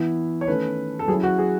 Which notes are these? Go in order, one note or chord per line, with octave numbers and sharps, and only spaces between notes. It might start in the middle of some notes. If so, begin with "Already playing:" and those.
Already playing: E3 B3 E4
C#5
D#3 A3 C#4 B4
A4
F#3 C#4 E4 G#4
F#4
G#4